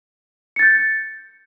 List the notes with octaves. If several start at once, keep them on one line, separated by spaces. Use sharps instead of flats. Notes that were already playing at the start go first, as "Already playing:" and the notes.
G6 A6 C#7